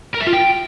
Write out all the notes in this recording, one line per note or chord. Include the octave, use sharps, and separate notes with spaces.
A#4
E5
F4
G5